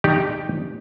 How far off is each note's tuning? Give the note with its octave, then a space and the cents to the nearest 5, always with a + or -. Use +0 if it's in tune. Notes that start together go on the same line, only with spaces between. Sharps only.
D#4 +0 G4 +0 D5 +25